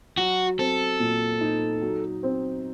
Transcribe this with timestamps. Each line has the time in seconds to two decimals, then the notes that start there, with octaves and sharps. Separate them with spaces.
0.18 F#3 F#4
0.59 C4 A4
1.00 A#2
1.41 D#4
1.82 F#3
2.23 C4